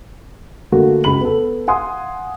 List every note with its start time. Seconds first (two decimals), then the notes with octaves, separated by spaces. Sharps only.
0.72 D3 A3 A#3 F#4
1.04 C#2 F#4 B5 F#7
1.21 B3 A4
1.68 F5 F#5 G#5 C6 D#6